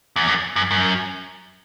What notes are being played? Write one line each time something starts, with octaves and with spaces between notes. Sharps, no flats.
E2
F#2
F#2
F#2